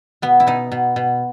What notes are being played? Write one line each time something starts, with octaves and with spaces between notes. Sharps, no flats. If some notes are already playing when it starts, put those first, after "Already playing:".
B2 B3
E4
B2 D#4
B2
B2